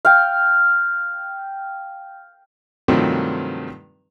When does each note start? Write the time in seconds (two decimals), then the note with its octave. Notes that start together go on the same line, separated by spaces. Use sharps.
0.05 F5 G5
2.88 G2 C3 D#3 F3 F#3 A3